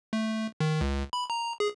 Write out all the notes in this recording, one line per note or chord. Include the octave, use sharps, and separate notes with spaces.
A3
D#3
C#2
B5
A#5
G#4